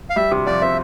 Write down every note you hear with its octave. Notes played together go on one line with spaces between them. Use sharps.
F5
G3 E5
C3
F2 D5
C4 E5